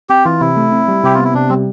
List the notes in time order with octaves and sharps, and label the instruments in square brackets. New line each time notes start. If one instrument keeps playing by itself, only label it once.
[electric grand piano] C4 [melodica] G4
[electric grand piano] E3 [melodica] F4
[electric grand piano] C3 [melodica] E4
[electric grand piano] A3
C4
G3
[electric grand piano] C3 [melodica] G4
[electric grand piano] B3 [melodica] F4
[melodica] E4
[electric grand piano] C3 [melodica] D4
[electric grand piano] G3 [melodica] C4